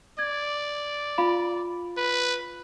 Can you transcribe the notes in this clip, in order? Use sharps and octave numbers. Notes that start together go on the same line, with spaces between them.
D5 G#6
F4 F5 B5
B4